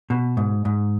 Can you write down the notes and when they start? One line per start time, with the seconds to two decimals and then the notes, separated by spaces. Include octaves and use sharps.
0.10 B2
0.37 G#2
0.65 G#2